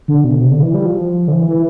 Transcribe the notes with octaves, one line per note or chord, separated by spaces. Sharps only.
D3
B2
C3
D3
E3
G3
F3
D3
E3
E3